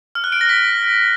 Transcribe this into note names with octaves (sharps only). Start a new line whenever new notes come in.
F6
F#6
D7
A#6
B6